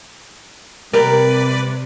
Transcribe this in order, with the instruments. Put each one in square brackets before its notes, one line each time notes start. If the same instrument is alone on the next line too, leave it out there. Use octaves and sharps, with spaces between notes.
[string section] C3 [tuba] G3 [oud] G4 A#4 [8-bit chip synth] B4 D5